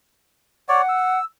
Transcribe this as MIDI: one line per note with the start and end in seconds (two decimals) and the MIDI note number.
0.69 0.82 73
0.69 0.82 74
0.69 1.20 78
0.89 1.25 88